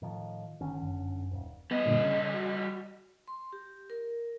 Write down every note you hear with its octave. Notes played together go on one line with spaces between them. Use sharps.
A2 D#3 F3
G1 D3 D#3 C#4
F#2
D#1
G3 B3 D#5
G2 A#2 D3
C#3
F#4
C6
G4
A#4